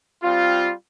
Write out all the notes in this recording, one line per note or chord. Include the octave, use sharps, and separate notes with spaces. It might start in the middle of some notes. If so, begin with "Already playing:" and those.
G3 C4 F4